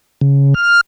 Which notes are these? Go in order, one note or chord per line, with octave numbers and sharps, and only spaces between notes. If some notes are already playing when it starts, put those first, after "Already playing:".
C#3
F6